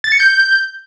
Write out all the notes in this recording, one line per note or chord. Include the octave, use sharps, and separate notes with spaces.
A6
C#7
G6